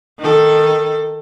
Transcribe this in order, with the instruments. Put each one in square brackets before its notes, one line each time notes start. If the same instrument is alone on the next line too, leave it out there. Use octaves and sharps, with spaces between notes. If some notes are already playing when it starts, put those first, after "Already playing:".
[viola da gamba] D#3 A4